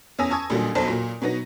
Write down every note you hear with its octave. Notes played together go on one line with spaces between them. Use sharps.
E2 C#4 G#5 D#6 E6 A#6
G#5 A5 C#6 D#6 E6 G#6
A1 A#2 D3 F#3 G3
B1 E2 F#3 C5 A5
A#2 F#3
B2 F#3 B3 D#4 A#6